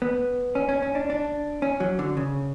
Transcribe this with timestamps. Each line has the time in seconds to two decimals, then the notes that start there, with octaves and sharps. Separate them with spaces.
0.02 B3
0.55 C#4
0.69 C#4
0.82 C#4
0.95 D4
1.10 D4
1.62 C#4
1.80 F#3
1.99 D3
2.17 C#3